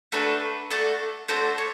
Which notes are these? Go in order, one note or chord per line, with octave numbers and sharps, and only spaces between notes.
A3 D4 F#4 A4 B4
A3 D4 F#4 A4
A3 D4 F#4 A4 C5
C#5